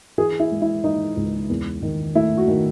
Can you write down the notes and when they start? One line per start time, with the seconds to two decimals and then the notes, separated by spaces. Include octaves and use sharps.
0.18 E3 G#4
0.40 E4
0.51 G#3
0.62 E4
0.84 E3 D#4
1.17 C#2
1.50 E2
1.82 D#3
2.15 A3 E4
2.37 F#4
2.48 D#3